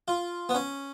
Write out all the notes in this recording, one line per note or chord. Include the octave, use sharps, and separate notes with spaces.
F4
B3
C#4